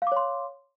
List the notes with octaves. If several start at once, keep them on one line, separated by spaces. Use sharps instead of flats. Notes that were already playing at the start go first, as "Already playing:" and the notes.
C#5 F5 C6 D6